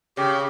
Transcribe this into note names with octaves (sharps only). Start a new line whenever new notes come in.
C#3 G4